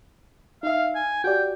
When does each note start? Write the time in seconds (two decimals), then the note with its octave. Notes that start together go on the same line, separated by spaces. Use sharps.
0.63 D#4 E5 F5
0.95 G#5
1.24 F#4 G4 D5 G5